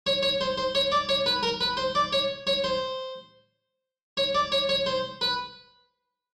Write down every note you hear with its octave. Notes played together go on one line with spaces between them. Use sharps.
C#5
C#5
C5
C5
C#5
D5
C#5
B4
A#4
B4
C5
D5
C#5
C#5
C5
C#5
D5
C#5
C#5
C5
B4